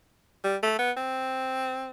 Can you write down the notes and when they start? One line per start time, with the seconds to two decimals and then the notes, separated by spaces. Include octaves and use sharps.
0.44 G3
0.63 A3
0.79 B3
0.96 C4